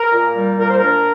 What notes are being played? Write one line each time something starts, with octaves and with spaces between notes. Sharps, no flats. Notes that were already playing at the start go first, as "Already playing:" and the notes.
Already playing: A#4
A#2
G3
A#2 A#4
C5
D4 A#4